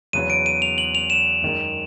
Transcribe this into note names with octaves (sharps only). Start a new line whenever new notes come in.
E2 C#3 F#3 B3 D#7
D7
D#7
F7
F#7
F7
E7
F#2 D#3 G#3